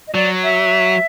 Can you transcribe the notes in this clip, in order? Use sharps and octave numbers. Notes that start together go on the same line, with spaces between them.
D#5
F#3 D5
E5